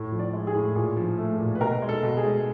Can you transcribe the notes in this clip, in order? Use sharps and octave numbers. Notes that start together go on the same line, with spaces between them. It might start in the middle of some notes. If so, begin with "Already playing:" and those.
Already playing: A2
F3
D5
G#3
G#4
A2
A#2 G#4
F3
A3
A#2
B4
B2 A#4
G#3
A4
B2
G#4
G#3